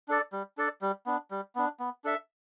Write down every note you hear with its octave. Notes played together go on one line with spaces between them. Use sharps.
D4 A4 D5
G3
D4 A4 D5
G3
B3 D4
G3
B3 D4
B3
D4 A4 E5